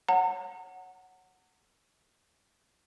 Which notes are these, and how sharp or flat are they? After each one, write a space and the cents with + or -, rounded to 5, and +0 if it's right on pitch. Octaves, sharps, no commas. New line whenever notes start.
C#5 -5 F#5 +0 A#5 -35